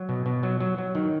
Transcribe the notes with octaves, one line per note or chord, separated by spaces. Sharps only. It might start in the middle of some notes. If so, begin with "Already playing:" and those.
Already playing: F#3
B2
B2
F#3
F#3
F#3
D#3